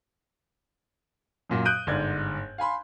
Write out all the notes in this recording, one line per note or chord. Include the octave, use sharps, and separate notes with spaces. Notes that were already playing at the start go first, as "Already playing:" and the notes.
F#2 A#2 F#3
D#6 F#6 G6 D7 D#7
G1 G#2 D5 G#6
F5 G#5 B5 C6